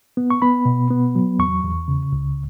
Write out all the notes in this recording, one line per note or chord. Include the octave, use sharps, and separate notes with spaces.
B3
C#6
B3 B5
B2
B3
F#3
E2 C#6
E2
C#3
C#2